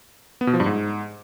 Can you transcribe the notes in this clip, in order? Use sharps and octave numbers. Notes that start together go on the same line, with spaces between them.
B3
B2
F3
G2
G#2